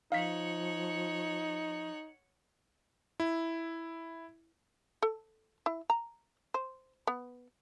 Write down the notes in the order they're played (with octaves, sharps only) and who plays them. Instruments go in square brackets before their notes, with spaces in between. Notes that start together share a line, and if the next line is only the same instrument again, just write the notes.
[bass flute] F3 [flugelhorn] D#4 [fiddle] C#5 F#5 [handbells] F5 B6
[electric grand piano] E4
[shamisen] A4
E4
A#5
C5
B3